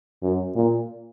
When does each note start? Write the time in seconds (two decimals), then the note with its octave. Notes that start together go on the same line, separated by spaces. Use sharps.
0.23 F#2
0.56 A#2